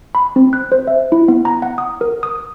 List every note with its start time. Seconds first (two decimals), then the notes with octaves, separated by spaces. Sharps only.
0.15 B5
0.36 C4
0.53 F#6
0.72 C5
0.87 E5
1.12 E4
1.28 B3
1.45 A#5
1.62 F#5
1.78 D#6
2.01 A#4
2.23 D#6